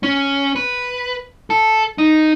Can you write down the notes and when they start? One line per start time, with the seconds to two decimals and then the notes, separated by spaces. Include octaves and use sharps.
0.03 C#4
0.56 B4
1.50 A4
1.98 D#4